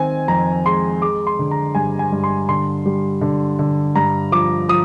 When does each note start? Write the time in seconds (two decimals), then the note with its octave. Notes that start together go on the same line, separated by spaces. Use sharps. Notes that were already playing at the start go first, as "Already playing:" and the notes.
Already playing: D#3 C4 G#5
0.28 F2 A#5
0.66 G#3 C6
1.01 G#3 D6
1.27 C6
1.39 D3
1.51 A#5
1.75 G2 G#5
1.99 G#5
2.12 G2
2.24 C6
2.49 D3 C6
2.86 G3
3.21 D3
3.59 D3
3.95 G2 A#5
4.32 F3 D6
4.69 F3 D#6